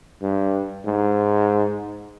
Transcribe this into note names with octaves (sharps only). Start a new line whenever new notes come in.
G2
G#2